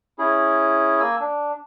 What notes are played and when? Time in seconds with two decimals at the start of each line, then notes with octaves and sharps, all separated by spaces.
0.19 C#4 E4 G#4
1.00 A#3 G#5 E6
1.20 D4